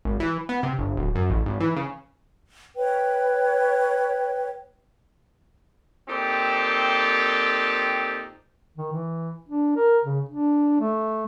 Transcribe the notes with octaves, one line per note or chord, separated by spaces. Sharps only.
G#1
E3
B3
C3
G1
D1
F#2
A1
G#1
E3
C#3
B4 C#5 G5
A#2 C4 D#4 G4 A4
D#3
E3
D4
A#4
C#3
D4
A3